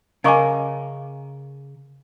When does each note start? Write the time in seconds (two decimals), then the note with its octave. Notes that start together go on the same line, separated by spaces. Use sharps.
0.24 C#3 A#4 D#5 F5 G#5 C#6 D6